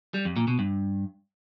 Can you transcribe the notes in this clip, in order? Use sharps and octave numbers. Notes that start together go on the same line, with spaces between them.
G3
F2
A#2
B2
G2